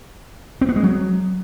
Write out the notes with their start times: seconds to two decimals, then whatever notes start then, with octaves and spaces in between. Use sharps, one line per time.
0.61 C4
0.69 B3
0.76 G#3
0.83 F#3